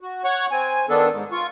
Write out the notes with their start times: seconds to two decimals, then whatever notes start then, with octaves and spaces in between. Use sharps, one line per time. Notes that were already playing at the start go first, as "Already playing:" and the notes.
0.01 F#4
0.24 C#5 F#5 C#6
0.51 C4 G#5
0.89 D#3 B3 D4 A4
1.10 G#2
1.32 F4 C#6